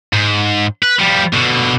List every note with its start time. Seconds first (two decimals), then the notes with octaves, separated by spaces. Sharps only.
0.13 G#2
0.83 B4
0.99 F3 G3
1.34 B2 D3